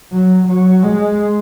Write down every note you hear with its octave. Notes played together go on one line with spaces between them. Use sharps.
F#3
F#3
G#3